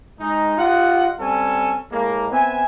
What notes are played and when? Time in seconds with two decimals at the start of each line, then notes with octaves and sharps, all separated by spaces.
0.20 G#3 D#4
0.58 F4 G4 D#5 F#5
1.20 G3 C4 C#4 A4 G#5
1.91 A2 G#3 A#3
2.31 B3 C4 E5 G#5